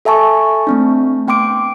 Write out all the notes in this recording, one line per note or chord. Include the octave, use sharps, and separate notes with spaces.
A4 E5 G#5 A5 C#6
A3 C4 D4
B3 G5 C6 D6 D7